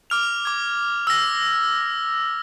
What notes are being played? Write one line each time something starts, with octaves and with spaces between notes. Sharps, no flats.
D6 F6 F7
D6 G#6
E6 A#6